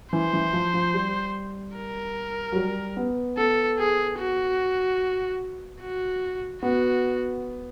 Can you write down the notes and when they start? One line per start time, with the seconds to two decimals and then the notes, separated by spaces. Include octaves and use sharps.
0.13 E3 C5
0.33 E3
0.53 F3
0.74 F3
0.94 G3
1.76 A#4
2.52 F#3
2.56 G3
2.97 B3
3.37 B3 A4
3.79 G#4
4.19 F#4
5.81 F#4
6.61 B3 F#4